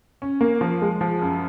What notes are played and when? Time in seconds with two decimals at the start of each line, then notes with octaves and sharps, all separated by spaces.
0.22 C#4
0.41 A#3
0.61 F3
0.82 G#3
1.01 F3
1.22 F#2